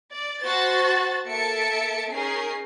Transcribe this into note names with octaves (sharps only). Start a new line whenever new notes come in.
D5
F#4 C5 A5 A6
A#3 A4 E5 A5 C#7 D7
C#4 D#4 G#4 A#4 C7